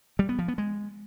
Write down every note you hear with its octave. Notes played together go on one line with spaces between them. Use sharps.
G3
B3
F3
B3
G#3